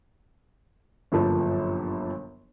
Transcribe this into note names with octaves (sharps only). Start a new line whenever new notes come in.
G1 F#2 A#2 F3 A4 B4